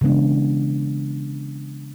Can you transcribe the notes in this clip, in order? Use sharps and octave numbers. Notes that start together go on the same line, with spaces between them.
C#3 E3 G#3 B3 D4